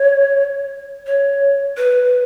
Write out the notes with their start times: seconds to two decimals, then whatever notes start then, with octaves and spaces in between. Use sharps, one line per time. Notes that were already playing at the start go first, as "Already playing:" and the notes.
Already playing: C#5
1.06 C#5
1.77 B4